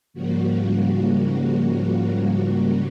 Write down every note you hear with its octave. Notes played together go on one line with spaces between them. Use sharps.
G#2 C#3 F3 G3 A#3 F#4